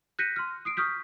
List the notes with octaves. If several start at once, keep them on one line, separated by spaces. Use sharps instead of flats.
F#6 G6 A#6 B6 C#7 D#7
C6 F6
D#6 C7 D7
C#6 D#6 F6 G6 B6